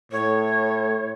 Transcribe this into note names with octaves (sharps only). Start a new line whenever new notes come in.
A2 C#5